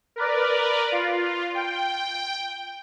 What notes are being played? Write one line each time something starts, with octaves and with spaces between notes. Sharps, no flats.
A#4 B4 D5
F4
G5